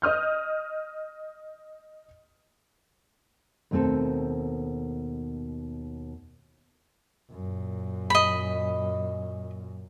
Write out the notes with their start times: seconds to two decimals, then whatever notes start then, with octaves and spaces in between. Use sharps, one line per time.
0.02 D#5 D#6 F6 G6
3.71 D#2 B2 A3 C4 A4
7.32 F#2 A#2
8.10 D#5 B5